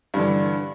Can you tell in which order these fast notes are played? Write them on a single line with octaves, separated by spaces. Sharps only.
G2 D3 E3